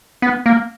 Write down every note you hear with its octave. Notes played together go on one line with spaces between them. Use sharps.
B3
A#3